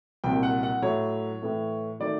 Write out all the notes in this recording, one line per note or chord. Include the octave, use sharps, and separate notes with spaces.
C2 A#2 F#3 G5
F#5
F#5
A2 F#3 A3 C#5
A2 E3 A3
D#3 F#3 A3 D5